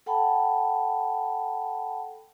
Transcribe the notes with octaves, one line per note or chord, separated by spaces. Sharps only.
A4 F#5 G5 A5 B5